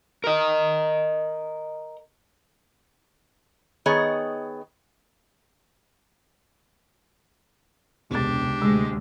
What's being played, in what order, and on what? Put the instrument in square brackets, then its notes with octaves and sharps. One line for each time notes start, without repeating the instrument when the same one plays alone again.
[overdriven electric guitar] A#4 D#5
[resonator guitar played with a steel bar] D#3 B3 G#4 C#5 D#5
[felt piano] E1 A6 [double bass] C#2 C3 [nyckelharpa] D4 G4
[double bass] D2 C3 [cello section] G#3 [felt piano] E6